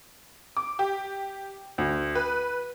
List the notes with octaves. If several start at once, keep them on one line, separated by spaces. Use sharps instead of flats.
D6
G4
D2
B4